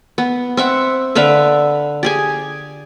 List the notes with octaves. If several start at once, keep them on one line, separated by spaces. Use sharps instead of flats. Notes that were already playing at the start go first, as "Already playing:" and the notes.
B3
C4 E5 F#5
D3 B4 E5 F5
G4 G#4 G#5